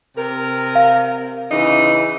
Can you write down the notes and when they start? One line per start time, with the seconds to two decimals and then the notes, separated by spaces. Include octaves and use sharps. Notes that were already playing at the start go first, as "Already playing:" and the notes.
0.16 C3 A#4
0.75 F5
1.51 C#3 E3 D#4